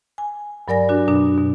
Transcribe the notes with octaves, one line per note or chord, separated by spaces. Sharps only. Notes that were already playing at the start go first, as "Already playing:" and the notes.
G#5
G2 F#3 A#4 D5 G#5 A#6
D4 F#4
F#2 B2 D4
B2